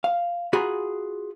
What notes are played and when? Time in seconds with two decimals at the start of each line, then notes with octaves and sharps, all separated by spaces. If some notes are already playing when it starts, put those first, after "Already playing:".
0.04 F5
0.53 F4 F#4 G#4 G#5 A#5 B5